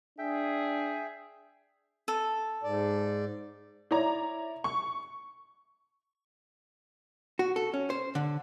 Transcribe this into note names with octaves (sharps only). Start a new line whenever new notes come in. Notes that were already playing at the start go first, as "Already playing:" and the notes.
D4 G#4 E5 G5
A4
G#2 D5
E4 C#5 D5 A#5
C#6
F#4
A4
C#4
C5
D3